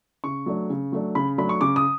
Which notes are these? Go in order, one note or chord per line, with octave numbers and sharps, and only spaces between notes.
C#3 C#6
F#3 A3 D4
C#3
F#3 A3 D4
C#3 B5
F#3 A3 D4 B5
C#6
C#3 D6
D#6